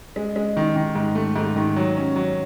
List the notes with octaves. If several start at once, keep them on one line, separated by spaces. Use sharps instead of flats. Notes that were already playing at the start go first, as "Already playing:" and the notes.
G#3
G#3
D#3
D#3
G#2
A3
G#2
D#3
F#3
C#4
F#3